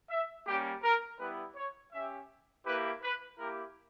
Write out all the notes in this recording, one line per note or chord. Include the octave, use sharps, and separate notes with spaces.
E5
G3 A#3 C#4 G4
A#4
G3 B3 E4 B4
C#5
C#4 G4 E5
A#3 E4 G4 B4
B4
A#3 E4 G4 A#4